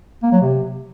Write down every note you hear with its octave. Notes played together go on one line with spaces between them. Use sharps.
A#3
F#3
C3